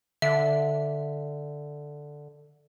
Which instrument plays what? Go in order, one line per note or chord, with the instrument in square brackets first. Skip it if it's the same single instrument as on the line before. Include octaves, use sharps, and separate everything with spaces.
[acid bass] D3 [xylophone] E5